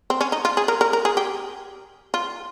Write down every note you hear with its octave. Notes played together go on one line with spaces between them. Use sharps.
C4
C#4
D#4
F4
G#4
A#4
A#4
A#4
G#4
G4
F4